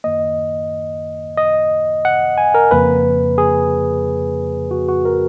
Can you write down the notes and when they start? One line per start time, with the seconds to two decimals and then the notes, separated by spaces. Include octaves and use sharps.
0.04 F#2 D#3 A#3 D#5
1.37 D#5
2.05 F#5
2.38 G#5
2.54 A#4
2.71 F2 C#3 F3 A#3 B4
3.38 G#4
4.71 F#4
4.89 F#4
5.05 A#4